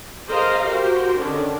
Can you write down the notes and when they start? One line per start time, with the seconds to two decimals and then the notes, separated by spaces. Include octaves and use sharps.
0.29 G#4 A#4 C5 D#5 F5 A#5
0.65 F#4 G4 A#4 C5
1.18 D3 D#3 C#4 D4